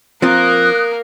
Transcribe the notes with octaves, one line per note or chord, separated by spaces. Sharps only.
F3 A#3 C4 F4 A#4 D#6 F#6